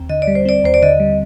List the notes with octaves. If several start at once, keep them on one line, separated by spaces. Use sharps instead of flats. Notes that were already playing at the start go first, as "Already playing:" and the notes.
Already playing: D#2 C4
D3 D#5
D5
G3
C5
C4 D5
D#2 C5
D5
D3 D#5
G3